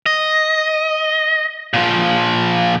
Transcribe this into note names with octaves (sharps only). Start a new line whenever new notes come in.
D#5
A#2 F3